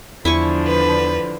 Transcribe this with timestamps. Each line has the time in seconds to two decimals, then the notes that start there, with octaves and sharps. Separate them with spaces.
0.25 E2 D3 F3 D4 E4 G#5 C#6
0.67 B4